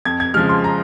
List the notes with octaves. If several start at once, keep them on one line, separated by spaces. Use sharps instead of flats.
F2 G#6
G#6
C#3 F3 G#3 F6
C6
A#5